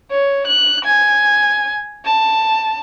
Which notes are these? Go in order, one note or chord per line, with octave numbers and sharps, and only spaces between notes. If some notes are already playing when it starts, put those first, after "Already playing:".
C#5
F#6
G#5
A5